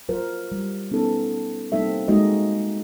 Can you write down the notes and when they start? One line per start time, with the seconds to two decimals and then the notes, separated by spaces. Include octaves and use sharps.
0.09 F#3 F4 A#4 C5
0.52 G3
0.91 B3 C#4 D#4 A4
1.72 G3 A#3 C4 D#4 A4 E5
2.08 G#3 A#3 D#4 F#4 D#5